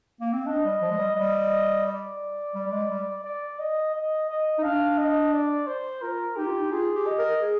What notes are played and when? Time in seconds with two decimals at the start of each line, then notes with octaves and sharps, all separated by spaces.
0.21 A#3
0.33 C4
0.46 D4 D#5
0.64 G3
0.82 F3
0.91 G#3
0.98 G3
1.15 G3 D#5
1.86 D5
2.55 G3
2.67 G3
2.72 G#3
2.89 G3
3.24 D5
3.59 D#5
3.94 D#5
4.29 D#5
4.58 D#4
4.63 D4 F5
4.98 D#5
5.33 D5
5.67 C5
6.02 F4 A#4
6.36 D#4 G4
6.47 F4
6.58 D#4
6.71 F4 G#4
6.95 G4
7.07 D#5
7.18 A#4
7.41 G#4